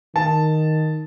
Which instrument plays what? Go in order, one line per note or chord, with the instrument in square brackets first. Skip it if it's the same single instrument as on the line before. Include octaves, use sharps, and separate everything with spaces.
[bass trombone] D#3 [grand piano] A5